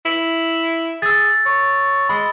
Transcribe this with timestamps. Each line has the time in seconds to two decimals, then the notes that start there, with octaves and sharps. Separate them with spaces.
0.05 E4
1.02 G#4 E6 A6
1.46 C#5
2.09 G#3 B5